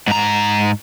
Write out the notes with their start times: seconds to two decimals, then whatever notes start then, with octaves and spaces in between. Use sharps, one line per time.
0.08 G#2 A#5